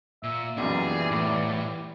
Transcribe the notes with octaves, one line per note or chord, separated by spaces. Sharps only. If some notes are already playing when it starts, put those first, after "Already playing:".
A#2 E5
B1 F#2 A#2 E3 G3 G#4 D5
A2